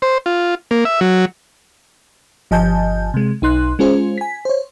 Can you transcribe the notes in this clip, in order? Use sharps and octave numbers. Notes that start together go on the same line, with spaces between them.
C5
F4
A#3
E5
F#3
G1 F3 D#5 G#5 A5 G6
C3 G#3
B1 D#4 C6 F#6
G#3 C#4 F4 G#4 C5
G#5 B6
C5 C#5